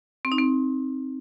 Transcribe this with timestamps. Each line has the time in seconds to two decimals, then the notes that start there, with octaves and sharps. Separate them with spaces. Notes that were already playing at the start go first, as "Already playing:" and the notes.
0.25 C4
0.32 D#4
0.39 C4